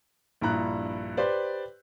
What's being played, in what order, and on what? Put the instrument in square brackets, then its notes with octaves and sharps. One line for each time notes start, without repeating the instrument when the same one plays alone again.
[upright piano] A#1 G2 E4 A#5 F#6
G4 B4 C5 D5